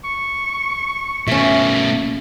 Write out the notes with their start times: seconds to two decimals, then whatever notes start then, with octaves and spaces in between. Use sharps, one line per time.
0.04 C#6
1.28 B2 A3 C#4 E5